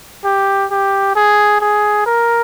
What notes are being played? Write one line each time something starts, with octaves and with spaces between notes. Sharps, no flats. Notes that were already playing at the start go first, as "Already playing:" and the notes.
G4
G4
G#4
G#4
A#4